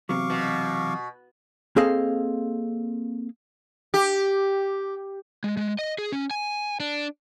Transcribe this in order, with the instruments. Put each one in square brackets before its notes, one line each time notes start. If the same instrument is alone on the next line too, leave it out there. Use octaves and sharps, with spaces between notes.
[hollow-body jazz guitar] E2 C3 F#3 [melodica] F5 C#6 D6
[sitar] B2
[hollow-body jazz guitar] A#3 C4 G#4 A4 D#5 F5
[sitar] G4
[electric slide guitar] G#3
G#3
D#5
G#4
C#4
G#5
D4